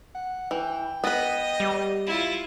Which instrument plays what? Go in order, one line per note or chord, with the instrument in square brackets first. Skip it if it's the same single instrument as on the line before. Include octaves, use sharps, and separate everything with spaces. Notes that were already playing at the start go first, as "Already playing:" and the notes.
[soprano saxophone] F#5
[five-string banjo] E3 [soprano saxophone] G5
[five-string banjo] B3 B4 [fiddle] D#5
[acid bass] G3
[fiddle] E4 F4